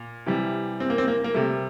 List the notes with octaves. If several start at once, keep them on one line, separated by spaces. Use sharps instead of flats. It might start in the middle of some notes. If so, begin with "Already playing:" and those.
Already playing: A#2
C3 E3 G3
C4
A#3
C4
A#3
A#3
C3 G3 A3